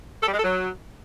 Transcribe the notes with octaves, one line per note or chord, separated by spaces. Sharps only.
A4
G3
G#3
A4
F#3